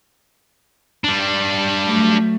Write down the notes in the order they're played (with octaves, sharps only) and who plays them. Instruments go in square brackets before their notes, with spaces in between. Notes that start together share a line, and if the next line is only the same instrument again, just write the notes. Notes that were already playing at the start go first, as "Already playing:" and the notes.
[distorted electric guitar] G3 D4
[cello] F#3 A3